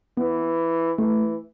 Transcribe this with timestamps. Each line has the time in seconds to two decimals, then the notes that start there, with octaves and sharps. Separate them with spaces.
0.17 E3 B3
0.98 E3 A3